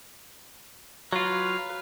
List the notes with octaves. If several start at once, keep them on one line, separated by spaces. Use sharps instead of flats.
F#3 F4 B4 F5